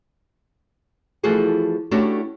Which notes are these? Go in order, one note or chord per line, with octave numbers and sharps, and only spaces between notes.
E3 F3 A3 F#4 G#4 A4
A3 C#4 D4 E4 F#4 G4